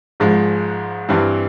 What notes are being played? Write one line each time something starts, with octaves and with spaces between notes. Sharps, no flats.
G#1 G#2 F3 G#3
G2 E3 G3 C4